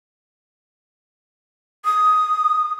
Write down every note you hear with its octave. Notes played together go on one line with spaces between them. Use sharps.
D#6